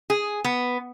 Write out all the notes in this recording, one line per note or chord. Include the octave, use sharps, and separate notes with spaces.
G#4
B3